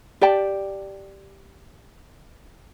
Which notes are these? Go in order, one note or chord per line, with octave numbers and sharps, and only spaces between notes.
G4 D5 G5 A5